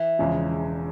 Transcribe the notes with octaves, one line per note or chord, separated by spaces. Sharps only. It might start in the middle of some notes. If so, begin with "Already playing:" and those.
Already playing: E3
E1 E2 C#3 F3 G#3